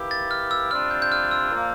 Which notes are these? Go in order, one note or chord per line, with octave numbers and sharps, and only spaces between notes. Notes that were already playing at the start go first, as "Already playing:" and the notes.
Already playing: E3 A#3 E4 G4
A6
F6
E6
C3 G3 D4 F4 F6
G6
G6
F6
E6
A#2 F3 A#3 F4